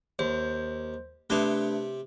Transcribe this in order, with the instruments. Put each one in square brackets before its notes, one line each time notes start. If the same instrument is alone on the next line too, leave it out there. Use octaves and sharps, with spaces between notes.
[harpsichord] D#2 [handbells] C5
[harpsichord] C3 G4 [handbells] A3 D4 B4